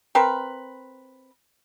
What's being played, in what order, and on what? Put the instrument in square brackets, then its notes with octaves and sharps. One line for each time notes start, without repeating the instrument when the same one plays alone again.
[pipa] C4 A#4 B4